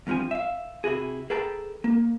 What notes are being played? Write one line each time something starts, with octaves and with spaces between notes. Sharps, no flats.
E2 G2 F3 C4 G#5
E5 F5
C3 E4 F#4 G#4
G#4 A4 B4 G5 A5 A#5
A#3